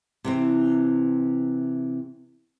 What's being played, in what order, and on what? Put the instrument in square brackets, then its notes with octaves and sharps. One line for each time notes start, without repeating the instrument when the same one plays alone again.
[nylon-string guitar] C3 E3 C4